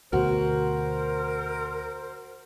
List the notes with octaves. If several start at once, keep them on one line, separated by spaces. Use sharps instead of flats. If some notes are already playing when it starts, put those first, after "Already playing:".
D2 B2 F#4 A#4 C5